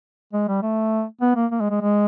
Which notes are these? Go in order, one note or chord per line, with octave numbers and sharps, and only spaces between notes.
G#3
G3
A3
B3
A#3
A#3
G#3
G#3
G#3